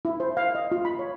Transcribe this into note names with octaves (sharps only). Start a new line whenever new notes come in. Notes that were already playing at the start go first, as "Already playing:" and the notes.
E4
C5
F5
D#5
F4
B5
C#5